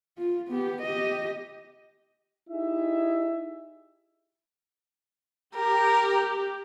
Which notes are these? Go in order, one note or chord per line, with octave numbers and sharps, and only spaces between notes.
F4
B3 G4
G4 D#5
D#4 E4 G4 G#4 E5
G4 A#4